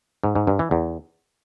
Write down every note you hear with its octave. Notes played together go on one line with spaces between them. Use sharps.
G#2
G#2
G2
E3
E2